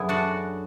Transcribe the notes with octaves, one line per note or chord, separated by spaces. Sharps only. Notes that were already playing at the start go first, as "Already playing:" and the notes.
Already playing: F#2 D3 F#3 E4 G#4 B4
D4 F#4